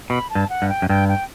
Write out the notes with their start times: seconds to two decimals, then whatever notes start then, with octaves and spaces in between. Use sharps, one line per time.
0.10 B2 B5
0.30 A5
0.35 G2
0.49 F#5
0.62 G2
0.69 G5
0.82 F#2
0.89 G2 G5
1.09 G5